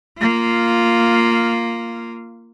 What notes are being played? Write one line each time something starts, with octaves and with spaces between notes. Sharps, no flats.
A#3 F4